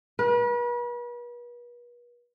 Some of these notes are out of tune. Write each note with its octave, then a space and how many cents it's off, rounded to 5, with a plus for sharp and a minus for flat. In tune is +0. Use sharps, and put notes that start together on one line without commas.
B4 -40